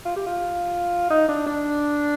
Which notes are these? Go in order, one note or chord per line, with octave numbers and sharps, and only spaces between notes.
F4
G4
F4
D#4
D4
D4